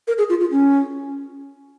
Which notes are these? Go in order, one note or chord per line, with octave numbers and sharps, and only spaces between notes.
A#4
G#4
F4
F4
C#4